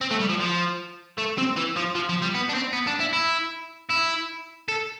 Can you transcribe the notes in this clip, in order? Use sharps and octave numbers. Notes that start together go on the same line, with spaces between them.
C4
A3
G3
F3
F3
A3
C4
E3
F3
F3
F3
G3
B3
D4
C4
B3
D4
E4
E4
E4
A4